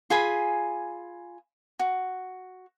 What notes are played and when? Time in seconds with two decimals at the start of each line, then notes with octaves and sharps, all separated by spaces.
0.10 F4 G#4 G#5 B5
1.79 F#4